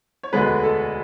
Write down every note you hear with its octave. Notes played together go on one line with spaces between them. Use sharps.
C#5
E1 D2 D3 G#3 B3 B4
A4